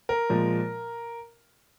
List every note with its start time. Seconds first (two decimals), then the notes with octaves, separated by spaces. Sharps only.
0.09 A#4
0.29 A#2 F3 G#3